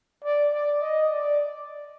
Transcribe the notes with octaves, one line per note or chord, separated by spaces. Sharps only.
D5
D5
D#5
D5